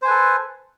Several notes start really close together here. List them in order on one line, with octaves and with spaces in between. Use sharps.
C5 G#5 B4 A4